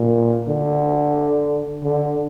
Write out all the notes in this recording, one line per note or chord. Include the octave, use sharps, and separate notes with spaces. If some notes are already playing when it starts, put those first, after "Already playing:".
Already playing: A#2
D3
D3